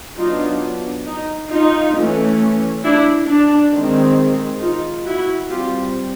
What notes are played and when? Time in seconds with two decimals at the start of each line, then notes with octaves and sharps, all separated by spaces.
0.17 F#3 B3 D4 D#4 F4
1.06 D#4
1.50 D#4 F4
1.95 E3 A3 C#4
2.84 D4 E4
3.27 D4
3.72 D#3 G#3 C4
4.60 D#4 F4
5.05 E4 F#4
5.49 G3 C4 F4 G4